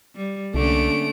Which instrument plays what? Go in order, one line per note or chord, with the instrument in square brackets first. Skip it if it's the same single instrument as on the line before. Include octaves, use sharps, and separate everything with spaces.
[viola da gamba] G3
[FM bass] C2 [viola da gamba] D3 A#3 C#4 [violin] A3 D7